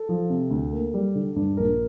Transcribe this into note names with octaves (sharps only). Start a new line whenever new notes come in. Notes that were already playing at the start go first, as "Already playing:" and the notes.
Already playing: A4
F3
C3
D2
A#3
G3
D3
G2
A#1 A#4